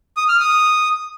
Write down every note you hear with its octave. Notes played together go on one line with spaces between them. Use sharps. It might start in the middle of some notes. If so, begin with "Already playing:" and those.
D#6
F6
D#6